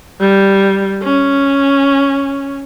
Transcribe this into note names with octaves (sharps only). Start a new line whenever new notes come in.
G3
C#4